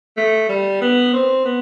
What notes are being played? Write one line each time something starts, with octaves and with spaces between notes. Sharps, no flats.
A3
G3
B3
C4
B3